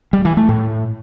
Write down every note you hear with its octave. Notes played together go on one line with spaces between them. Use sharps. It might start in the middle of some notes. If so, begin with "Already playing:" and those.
G3
E3
A3
A2